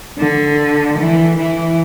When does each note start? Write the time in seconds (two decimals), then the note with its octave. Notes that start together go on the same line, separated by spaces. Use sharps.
0.18 D3
0.98 E3
1.37 E3